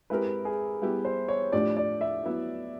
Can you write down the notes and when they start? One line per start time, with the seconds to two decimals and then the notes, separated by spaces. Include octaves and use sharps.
0.10 G#3 C4 E4 G4 A#4 B4
0.45 G#4
0.82 G3 B3 E4 G4
1.05 C5
1.28 C#5
1.52 A2 F3 A3 D4 G4 D5
1.77 D5
2.01 E5
2.24 F#3 B3 E4